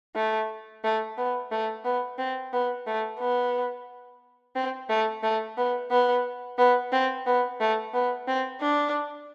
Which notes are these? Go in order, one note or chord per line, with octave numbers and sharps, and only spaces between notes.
A3
A3
B3
A3
B3
C4
B3
A3
B3
C4
A3
A3
B3
B3
B3
C4
B3
A3
B3
C4
D4